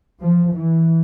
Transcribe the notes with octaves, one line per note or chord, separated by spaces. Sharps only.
F3
E3